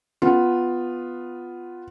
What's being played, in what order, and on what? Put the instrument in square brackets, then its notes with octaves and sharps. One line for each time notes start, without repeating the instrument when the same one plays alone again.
[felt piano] B3 F4